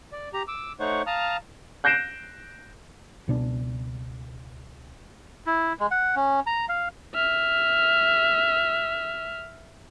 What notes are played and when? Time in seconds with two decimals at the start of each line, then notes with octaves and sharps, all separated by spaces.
0.12 D5
0.34 G4 A#5
0.48 D6 E6
0.80 A3 D#4 C5 C#5 F#5 C#6
1.07 F5 A5 A#5 D#6 F6
1.84 F#6 G6 A#6 C7 D7 E7
3.28 C#2 B2 D4
5.47 E4
5.80 G#3
5.91 F#5
6.16 C#4
6.47 A#5
6.69 F5
7.14 E5 F6